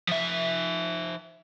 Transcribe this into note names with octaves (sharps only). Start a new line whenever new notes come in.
F3 E5